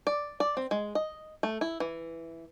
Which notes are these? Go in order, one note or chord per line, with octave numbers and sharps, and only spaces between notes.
D5
D5
C4
G#3
D#5
A3
E4
E3